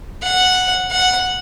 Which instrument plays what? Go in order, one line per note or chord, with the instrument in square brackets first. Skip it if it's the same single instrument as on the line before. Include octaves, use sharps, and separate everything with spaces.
[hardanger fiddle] F#5
F#5